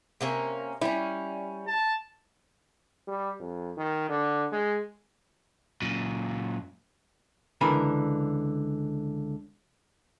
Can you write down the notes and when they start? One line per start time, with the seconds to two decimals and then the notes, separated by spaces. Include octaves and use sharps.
0.21 C3 A#3 C#4
0.81 G3 C#4 E4
1.67 A5
3.08 G3
3.40 F2
3.77 D#3
4.09 D3
4.52 G#3
5.82 F#2 A#2
7.61 C#2 D3 E3 A#4 G#5 B5